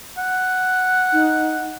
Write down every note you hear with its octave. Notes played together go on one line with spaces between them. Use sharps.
F#5
D#4